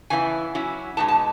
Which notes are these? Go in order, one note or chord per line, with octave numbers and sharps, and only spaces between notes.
C#3 E3 B3 E4 G#5
F#3 C#4 E4
B2 G#3 B3 D#4 A5
A5